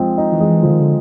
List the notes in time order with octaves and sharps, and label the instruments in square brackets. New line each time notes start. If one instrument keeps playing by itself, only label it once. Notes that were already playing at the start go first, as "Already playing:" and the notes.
Already playing: [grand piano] F3 G#3 C4 D#4
D#4
[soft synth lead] E3
[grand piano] G#3
[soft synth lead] D3 [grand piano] F3
[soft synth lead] D#3
D3